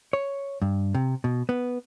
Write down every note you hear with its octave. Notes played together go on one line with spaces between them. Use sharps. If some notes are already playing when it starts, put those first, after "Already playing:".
C#5
G2
C3
B2
B3